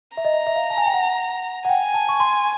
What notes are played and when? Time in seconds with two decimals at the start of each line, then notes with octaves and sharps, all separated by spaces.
0.17 E5 A#5
0.25 D#5
0.33 E5
0.47 E5
0.56 F5
0.70 A5
0.77 G#5
0.86 G5
0.94 F#5
1.65 F#5
1.69 G5 G#5
1.94 A5
2.09 C#6
2.20 C6